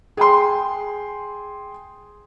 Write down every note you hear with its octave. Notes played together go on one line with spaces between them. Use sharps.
G#4 G5 C6